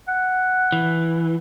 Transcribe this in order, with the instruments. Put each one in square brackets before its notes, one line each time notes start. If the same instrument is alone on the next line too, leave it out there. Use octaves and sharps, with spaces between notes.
[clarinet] F#5
[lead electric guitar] E3